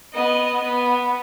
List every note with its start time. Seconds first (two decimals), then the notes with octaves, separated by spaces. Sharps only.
0.13 B3 D#5
0.64 B3